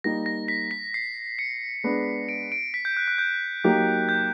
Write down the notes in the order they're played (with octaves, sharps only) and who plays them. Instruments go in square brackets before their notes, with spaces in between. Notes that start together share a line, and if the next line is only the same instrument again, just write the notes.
[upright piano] G3 A#3 D#4 [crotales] A#6
[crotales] A#6
B6
B6
C7
C#7
[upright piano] G#3 B3 D4
[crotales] D7
D7
B6
G6
F#6
F#6
G6
[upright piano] F#3 A#3 D#4 G4
[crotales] G6